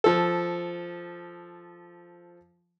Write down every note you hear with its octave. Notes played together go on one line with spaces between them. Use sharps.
F3 A4